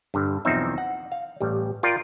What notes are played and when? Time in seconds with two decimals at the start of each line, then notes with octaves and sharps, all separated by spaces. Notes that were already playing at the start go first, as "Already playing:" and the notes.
0.14 G2 D3
0.45 B1 E2 F3 C4 D#4 E5
0.78 F#5
1.12 F5
1.41 A1 G3
1.83 F4 A#4 D5 G5